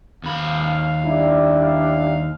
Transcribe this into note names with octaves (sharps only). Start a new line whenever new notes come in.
D#2 F5 B5
G3 D4 E4
F5